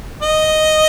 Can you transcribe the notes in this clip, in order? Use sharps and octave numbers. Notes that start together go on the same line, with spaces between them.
D#5